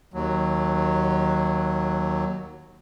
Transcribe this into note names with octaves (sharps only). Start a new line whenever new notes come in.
D#2 F#3